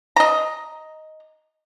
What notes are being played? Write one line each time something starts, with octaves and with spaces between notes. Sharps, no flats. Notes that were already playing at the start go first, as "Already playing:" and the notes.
D#5 A#5